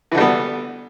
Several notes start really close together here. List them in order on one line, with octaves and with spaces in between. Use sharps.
E3 D3 G3 B3